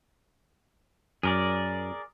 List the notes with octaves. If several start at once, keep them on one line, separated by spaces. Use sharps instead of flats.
F#2 G#4 A#4 D5